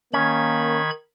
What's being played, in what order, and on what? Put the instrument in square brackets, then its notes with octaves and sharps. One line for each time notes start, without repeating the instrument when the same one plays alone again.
[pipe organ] D#3 B5 G#6 [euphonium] A#3 [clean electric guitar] C#4